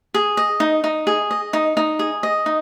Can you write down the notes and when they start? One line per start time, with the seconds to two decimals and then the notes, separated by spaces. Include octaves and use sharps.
0.14 G#4
0.37 D#5
0.60 D#4
0.84 D#4
1.07 G#4
1.31 D#5
1.53 D#4
1.77 D#4
1.99 G#4
2.23 D#5
2.46 D#4